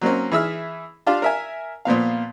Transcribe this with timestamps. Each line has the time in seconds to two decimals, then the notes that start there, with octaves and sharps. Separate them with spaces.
0.01 F#3 A#3 C4 C#4
0.32 E3 G#4 E5 E6 F6
1.07 D4 F4 G4 F5
1.22 A#4 E5 G#5
1.85 A#2 F3 B3 F5